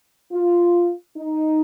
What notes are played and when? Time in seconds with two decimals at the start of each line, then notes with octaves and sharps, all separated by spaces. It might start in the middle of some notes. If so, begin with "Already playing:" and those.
0.32 F4
1.16 D#4